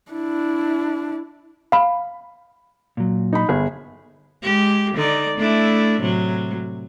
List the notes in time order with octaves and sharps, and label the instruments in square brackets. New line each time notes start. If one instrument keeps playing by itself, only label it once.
[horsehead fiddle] D4 E4
[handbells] F5 B5
[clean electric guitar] A#2 F#3
[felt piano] D#4 B5
[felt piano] G1 [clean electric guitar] G#4
[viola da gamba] G#3 G4
D3 D#4 D5
A3 D4 E4
A2 C3 F#3